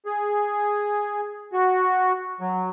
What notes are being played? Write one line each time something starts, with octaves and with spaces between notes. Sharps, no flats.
G#4
F#4
F#3